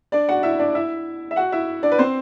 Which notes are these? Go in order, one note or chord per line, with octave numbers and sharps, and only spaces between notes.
D4 D5
F#4 F#5
E4 E5
D4 D5
E4 E5
E5
F#4 F#5
E4 E5
D4 D5
B4
C4 C5